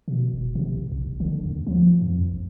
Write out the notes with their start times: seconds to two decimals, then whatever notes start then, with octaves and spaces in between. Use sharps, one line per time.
0.08 B2
0.33 F1
0.55 C3
0.74 A1
0.92 B1
1.07 D#1
1.20 D3
1.46 D#2
1.67 F3
2.01 F2
2.32 A1